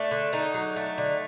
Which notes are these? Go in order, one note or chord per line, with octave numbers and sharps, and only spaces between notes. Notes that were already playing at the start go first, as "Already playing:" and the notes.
Already playing: A3 D4
D3
D3 D#4
F#3
A3
D3